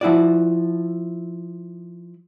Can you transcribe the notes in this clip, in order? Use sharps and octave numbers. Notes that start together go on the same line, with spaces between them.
F3 E4 F#4 D5